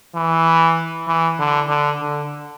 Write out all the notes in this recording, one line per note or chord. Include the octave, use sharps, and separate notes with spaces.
E3
E3
D3
D3
D3